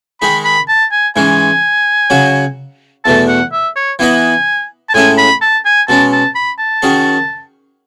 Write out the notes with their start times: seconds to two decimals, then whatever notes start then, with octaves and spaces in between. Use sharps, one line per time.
0.21 D#3 G#3 D#4 G#4 B5
0.45 B5
0.68 A5
0.92 G#5
1.16 G#2 E3 G#3 C#4 G#5
2.10 C#3 F#3 C#4 F#4
3.04 E2 B2 A3 A5
3.28 F#5
3.52 E5
3.76 C#5
3.99 E3 B3 E4 B4 D#5 G#5
4.89 A5
4.94 A2 G#3 C#4 E4 A4 G#5
5.18 B5
5.41 A5
5.65 G#5
5.88 B2 G#3 C#4 A5
6.12 A5
6.35 B5
6.59 A5
6.82 D#3 F#3 C#4 G#4